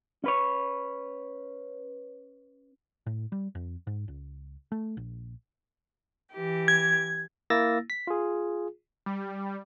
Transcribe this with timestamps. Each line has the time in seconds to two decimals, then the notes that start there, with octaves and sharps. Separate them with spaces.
0.24 C#4 B4 C#5
3.06 A2
3.32 G3
3.55 F2
3.87 G#2
4.08 C#2
4.72 A3
4.97 A#1
6.33 E3 G4
6.68 G#6
7.50 A#3 E4 E6 A6 A#6
7.90 B6
8.07 F4 G#4
9.06 G3